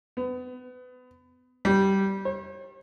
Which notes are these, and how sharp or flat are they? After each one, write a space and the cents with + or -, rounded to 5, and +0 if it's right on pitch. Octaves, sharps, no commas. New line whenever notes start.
B3 +30
G3 -10
C#5 -45